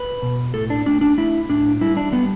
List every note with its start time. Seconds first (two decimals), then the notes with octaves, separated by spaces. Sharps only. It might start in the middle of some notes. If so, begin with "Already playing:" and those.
Already playing: B4
0.22 B2
0.54 A2 A4
0.70 D4
0.86 A3 D4
1.01 D4
1.18 A3 E4
1.49 A2 D4
1.81 G3 E4
1.97 D4
2.13 G3 B3